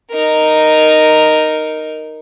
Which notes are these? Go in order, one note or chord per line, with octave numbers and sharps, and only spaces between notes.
D#4 A#4